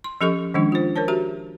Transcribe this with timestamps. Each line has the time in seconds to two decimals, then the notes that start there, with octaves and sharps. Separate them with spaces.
0.04 C6
0.21 F3 C#4 G4 A4 D#5 C#6
0.54 D#3 F3 G#3 C#4 D4
0.72 F4 C5
0.96 A#4 C5 C#5 A5
1.08 F#4 G4 E5 A#5